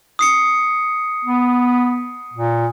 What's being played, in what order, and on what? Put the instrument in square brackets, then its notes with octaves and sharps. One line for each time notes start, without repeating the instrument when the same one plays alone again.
[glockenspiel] D#6 C7 C#7
[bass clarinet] B3
A#2